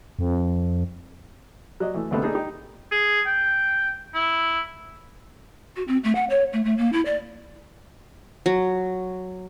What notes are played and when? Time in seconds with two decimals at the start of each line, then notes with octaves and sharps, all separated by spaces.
0.19 F2
1.80 F#3 D5 D#5
1.94 E3 A3
2.11 C2 B2 D3 A3 B3 C4
2.23 D4 D#4 G#4 A4
2.35 D#4 G4
2.92 G#4
3.26 G5
4.14 E4
5.76 F#4
5.87 C4
6.03 A3
6.15 F#5
6.30 C#5
6.53 A3
6.64 A3
6.77 A#3
6.92 E4
7.05 D5
8.46 F#3